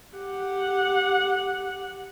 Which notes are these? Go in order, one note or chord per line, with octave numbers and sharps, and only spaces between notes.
G4 F#5